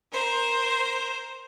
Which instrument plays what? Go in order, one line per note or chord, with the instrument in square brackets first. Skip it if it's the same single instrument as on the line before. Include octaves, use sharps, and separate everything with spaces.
[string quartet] A#4 C5